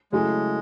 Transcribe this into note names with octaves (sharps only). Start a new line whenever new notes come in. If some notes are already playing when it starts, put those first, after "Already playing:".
C#3 F#3 G#3 A3 E4 G#4